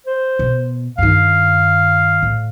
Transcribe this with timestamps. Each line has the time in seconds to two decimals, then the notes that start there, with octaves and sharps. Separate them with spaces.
0.07 C5
0.39 B2
0.98 G2 D#3 F5
2.22 A2